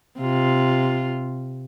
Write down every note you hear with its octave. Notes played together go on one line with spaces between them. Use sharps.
C3 F4